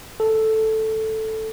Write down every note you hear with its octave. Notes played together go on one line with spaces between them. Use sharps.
A4